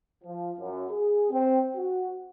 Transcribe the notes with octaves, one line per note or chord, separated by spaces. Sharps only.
F3
F#2
G#4
C4
F#4